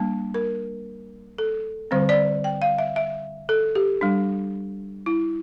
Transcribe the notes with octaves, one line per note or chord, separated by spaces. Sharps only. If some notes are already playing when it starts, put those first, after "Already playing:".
Already playing: G3 A#3 D4 A5
A#4
A4
D3 G3 C4 C5
D5
G5
F5
E5
E5
A4
G4
G3 D4
E4